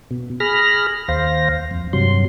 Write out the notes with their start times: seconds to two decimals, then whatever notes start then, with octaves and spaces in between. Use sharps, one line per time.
0.11 B2
0.40 G#4 B5 F6 A#6
1.08 D#2 C5 F5 A#6
1.71 F2
1.93 G2 C3 F#3 C6